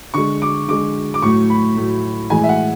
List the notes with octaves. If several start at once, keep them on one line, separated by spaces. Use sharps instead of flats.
D3 G#3 C#6
D6
D3 G#3 D6
D6
A2 F#3 A3 C#6
B5
A2 F#3 A3
A2 E3 G#3 G#5
E5
F#5